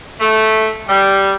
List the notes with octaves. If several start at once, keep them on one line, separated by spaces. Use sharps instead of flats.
A3
G3